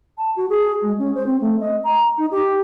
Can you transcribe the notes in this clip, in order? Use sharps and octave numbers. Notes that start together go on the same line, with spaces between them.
A5
F#4
G#4
G#3
C#4
C5
C4
A3
D#5
A#5
D#4
G4